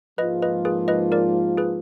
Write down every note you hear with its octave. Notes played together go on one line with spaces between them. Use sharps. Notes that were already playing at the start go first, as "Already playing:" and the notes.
G#2 F3 A#3 F4 B4 D#5
B4 D#5
G#4 B4
B4 D#5
A#4 D5
G#4 B4